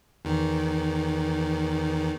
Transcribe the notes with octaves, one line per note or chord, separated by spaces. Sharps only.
E2 D#3